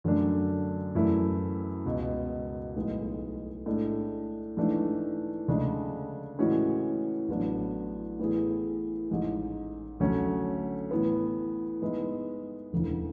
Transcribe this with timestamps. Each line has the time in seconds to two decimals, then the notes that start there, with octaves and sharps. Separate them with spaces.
0.04 F#2 D3 F#3 A3 D4
0.95 F#2 E3 A3 E4
1.85 C#2 B2 G#3
2.76 B1 A2 G#3 B3
3.66 A2 G#3 D4 A4
4.57 G#2 E3 A3 D4
5.48 D2 C#3 G#3 D4
6.39 A2 E3 G#3 C#4 F#4
7.29 A1 A2 F#3 B3 D4
8.19 A2 E3 B3 E4 G#4
9.10 A1 G#2 G#3
10.00 D2 D3 F#3 A3 C#4
10.91 A2 E3 B3
11.82 G#2 G#3 B3 E4
12.72 E1 D2 C#3 E3